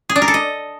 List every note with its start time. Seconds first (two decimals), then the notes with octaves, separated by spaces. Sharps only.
0.09 G#4
0.16 D4
0.22 A#4
0.28 A4
0.34 D#5